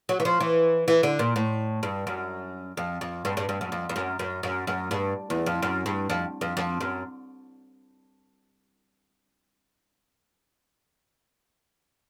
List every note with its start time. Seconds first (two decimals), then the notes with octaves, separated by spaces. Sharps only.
0.09 F#3
0.20 E3
0.25 F3
0.40 E3
0.88 E3
1.03 D3
1.19 A#2
1.36 A2
1.83 G2
2.07 F#2
2.77 F2
3.01 F2
3.25 G2
3.37 G2
3.49 G2
3.61 F#2
3.72 F2
3.89 F2
3.96 F#2
4.19 F#2
4.43 F#2
4.67 F#2
4.91 G2
5.30 E2
5.46 F2
5.62 F#2
5.86 G2
6.10 F2
6.41 F2
6.57 F2
6.81 F#2